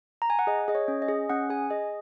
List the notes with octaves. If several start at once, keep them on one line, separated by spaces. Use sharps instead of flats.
A#5
G#5
F#5
G#4 D#5
G#4 D#5
C#5
C#4
D#5
G#4
C#4 F#5
G#4 G#5
G#4 D#5